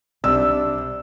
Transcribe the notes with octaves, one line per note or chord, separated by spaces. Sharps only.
B1 C3 G3 C4 D4 E6